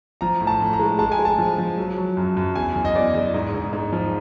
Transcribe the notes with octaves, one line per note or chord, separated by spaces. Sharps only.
F3 A#5
A2
A5
A2
A#5
G#3
G#3 A5
G#5
G#3
A5
F3
F3
F#3
F#3
F#2
F#2
E2 G#5
E2
D#5
E2 D5
E2
G#2
G#2
G#2
F3